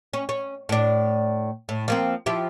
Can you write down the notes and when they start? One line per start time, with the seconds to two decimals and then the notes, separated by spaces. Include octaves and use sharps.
0.13 C#4
0.29 C#4
0.69 A2 D4
1.69 A2
1.88 F3 A#3 C4
2.26 F3 E4 G4